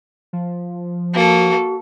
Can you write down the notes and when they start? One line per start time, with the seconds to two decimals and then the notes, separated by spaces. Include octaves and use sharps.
0.33 F3
1.14 A#3 F#4 A4